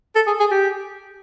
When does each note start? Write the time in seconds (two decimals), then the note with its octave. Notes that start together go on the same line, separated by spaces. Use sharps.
0.15 A4
0.27 G#4
0.40 G#4
0.51 G4